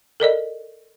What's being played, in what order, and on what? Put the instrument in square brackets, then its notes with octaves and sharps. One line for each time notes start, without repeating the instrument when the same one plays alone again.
[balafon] A4 A#4 D5 D#5